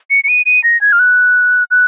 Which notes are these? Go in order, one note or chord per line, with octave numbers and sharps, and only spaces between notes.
C#7
C#7
D#7
D#7
A#6
G#6
F6
F#6
F#6